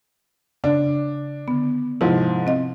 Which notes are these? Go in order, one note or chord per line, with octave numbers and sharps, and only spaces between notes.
C#3 D4
D3 B3
G#2 C3 F3 E4
C4 D#5 F5